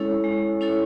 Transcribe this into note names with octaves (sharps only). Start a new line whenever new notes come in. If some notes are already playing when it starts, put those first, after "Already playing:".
Already playing: G#3 C#4 E4 A4 C#5
G#3
C#4 E4 A4 C#5